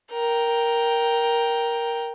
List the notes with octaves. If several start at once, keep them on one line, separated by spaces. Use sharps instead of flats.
A#4 G5